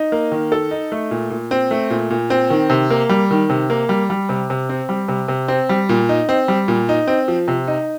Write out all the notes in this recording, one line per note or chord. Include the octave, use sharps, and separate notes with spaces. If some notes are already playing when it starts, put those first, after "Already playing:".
Already playing: D#4
A#3
D#3
A4
D#4
A3
A#2
A#2
C4
A3
A#2
A#2
C4
D#3
C3
A#3
G3
D#3
C3
A#3
G3
G3
C3
C3
C4
G3
C3
C3
C4
G3
A#2
D#4
C4
G3
A#2
D#4
C4
F3
C3
D#4